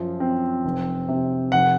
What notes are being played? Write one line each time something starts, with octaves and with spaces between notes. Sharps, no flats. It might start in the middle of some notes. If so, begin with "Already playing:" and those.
Already playing: F#2 F3
C4
F1
C3
F1 F#5